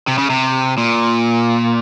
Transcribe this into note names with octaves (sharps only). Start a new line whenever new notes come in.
C3
C#3
C3
A#2